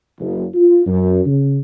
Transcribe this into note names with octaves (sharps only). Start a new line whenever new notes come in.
F#1
F4
F#2
C#3